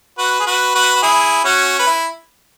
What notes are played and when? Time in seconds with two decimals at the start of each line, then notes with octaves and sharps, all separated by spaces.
0.18 F#4 B4
0.40 G#4
0.46 F#4 B4
0.75 F#4 B4
0.95 F#4
1.02 E4 G#4
1.44 C#4 F#4
1.79 B4
1.87 E4